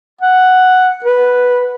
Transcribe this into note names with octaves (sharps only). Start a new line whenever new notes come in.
F#5
B4